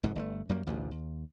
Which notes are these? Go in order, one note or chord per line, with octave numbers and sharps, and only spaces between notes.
F1 G#2 B2
G1 C#3 A3
F#2 F#3 G3 A#3
A1 D2 G2 B2
D#2